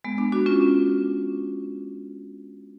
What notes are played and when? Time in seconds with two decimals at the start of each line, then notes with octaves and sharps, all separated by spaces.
0.04 G#3 B3
0.18 B3 D4
0.32 D4 F#4
0.46 C#4 F4